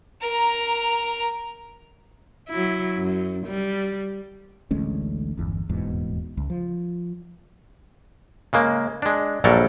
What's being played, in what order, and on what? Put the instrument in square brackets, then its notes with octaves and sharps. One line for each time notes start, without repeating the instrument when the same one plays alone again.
[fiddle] A#4 A#5
[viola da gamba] F#3 E4
F#2
G3
[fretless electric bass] A1 D2 G#3 C#4
G1 E2
D#1 E2 G#2 B2
C#2
F3
[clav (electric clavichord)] C#3 G#3 A#3
G#3 D4
A#1 F#3 G3 A4 A#4